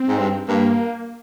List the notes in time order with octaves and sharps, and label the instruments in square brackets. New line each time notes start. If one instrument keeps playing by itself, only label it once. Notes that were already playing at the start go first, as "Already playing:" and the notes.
Already playing: [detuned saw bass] C4
[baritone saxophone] G#2
G2
[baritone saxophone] G2 [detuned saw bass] A#3